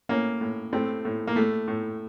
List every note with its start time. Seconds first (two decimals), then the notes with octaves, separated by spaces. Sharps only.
0.09 A2 A#3 C#4
0.41 A2
0.73 A2 A3 C4
1.05 A2
1.27 A#3
1.36 A2 A3
1.68 A2